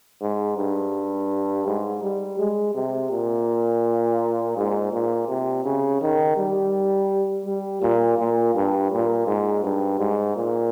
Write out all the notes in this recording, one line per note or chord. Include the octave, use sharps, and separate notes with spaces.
G#2
G2
G#2
G3
G#3
C3
A#2
G#2
A#2
C3
C#3
D#3
G3
G3
A#2
A#2
G2
A#2
G#2
G2
G#2
A#2